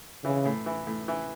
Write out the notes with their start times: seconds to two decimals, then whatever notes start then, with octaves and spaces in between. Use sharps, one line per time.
0.24 C#3 E3
0.45 A2
0.66 E3
0.87 A2
1.08 E3